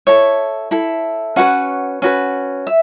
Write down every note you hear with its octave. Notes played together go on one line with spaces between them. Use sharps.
E4 A4 C#5
E4 A4
C#4 F#4 B4 F#5
C#4 F#4 B4
E5